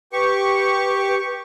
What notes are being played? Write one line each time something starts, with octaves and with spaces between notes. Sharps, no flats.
G4 B4 C#6